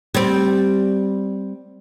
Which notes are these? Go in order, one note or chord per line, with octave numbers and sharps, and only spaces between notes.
G3 C4